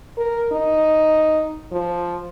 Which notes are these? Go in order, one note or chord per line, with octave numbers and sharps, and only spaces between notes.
A#4
D#4
F3